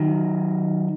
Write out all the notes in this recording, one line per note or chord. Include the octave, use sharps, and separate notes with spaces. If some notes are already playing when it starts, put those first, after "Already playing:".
Already playing: D#3 F#3